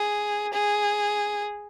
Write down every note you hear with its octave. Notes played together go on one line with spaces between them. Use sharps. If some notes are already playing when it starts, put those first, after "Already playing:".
Already playing: G#4
G#4